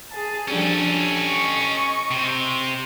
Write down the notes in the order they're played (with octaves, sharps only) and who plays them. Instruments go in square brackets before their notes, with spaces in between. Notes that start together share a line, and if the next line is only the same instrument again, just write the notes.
[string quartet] G#4 A5
[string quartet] F3 G3 D4 [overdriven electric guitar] C#4 A4
[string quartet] D#5 C#6
[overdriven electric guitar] C3